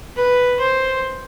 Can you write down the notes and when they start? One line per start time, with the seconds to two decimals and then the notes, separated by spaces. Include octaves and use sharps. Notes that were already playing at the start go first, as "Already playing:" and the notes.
0.16 B4
0.59 C5